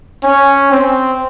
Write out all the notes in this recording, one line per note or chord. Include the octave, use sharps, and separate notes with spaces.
C#4
C4